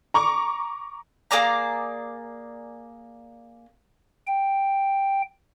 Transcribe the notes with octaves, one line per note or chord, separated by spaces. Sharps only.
A#5 C#6 D6
A#3 G#4 D5 A#5
G5